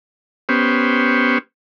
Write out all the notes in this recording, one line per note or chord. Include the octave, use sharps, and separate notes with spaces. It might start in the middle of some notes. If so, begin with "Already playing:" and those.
B3 C#4 G4 C5